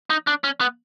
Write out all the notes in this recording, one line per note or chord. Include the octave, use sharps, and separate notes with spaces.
D#4
D4
C#4
B3